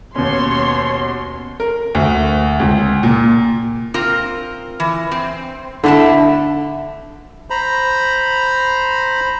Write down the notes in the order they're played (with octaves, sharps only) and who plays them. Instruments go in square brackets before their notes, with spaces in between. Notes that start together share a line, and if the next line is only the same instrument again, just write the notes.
[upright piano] D#2 B2 C#4 [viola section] C#5 C6
[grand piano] A#4
D2
C#2
A#2
[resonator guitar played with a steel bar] C4 F4 A#4
E3
C4
[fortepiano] D3 [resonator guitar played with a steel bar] A3 E4 A5
[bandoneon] C5 A#5 B5